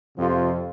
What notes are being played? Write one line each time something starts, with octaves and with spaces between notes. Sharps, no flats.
F2 C3 F3 C4 F4